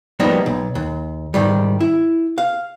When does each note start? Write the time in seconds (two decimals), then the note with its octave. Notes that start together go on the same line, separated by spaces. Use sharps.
0.19 F3 G3 A#3 B3 D#4
0.46 B1
0.75 D#2
1.34 G#2 D#3 G3
1.80 E4
2.38 F5